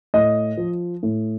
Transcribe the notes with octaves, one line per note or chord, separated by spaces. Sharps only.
A2 D#5
F3
A2